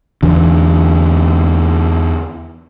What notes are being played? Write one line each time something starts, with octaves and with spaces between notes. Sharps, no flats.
E2 D3